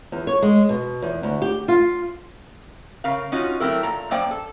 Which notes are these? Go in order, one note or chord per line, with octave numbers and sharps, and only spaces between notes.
E2
C#5
G#3
B2
E2
D2
G4
F4
C#3 A#4 F5
C#4 D#4 F4 F#4
F#3 A3 C4 E4 A#4
A#2 A#5
F#2 A#3 C5 D5 G5
A4